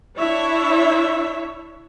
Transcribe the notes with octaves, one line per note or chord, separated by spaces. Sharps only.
D4 E4 C#5 E5